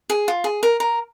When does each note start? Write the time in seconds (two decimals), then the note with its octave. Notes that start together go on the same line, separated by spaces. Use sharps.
0.10 G#4
0.28 F4
0.44 G#4
0.63 A#4
0.80 A#4